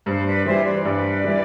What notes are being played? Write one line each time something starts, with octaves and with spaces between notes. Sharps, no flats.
G2 C5
B4 D5
E3 G3 C5 E5
B4 D5
G2 B4 D5
E3 G3